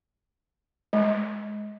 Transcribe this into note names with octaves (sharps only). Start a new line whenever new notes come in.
G#3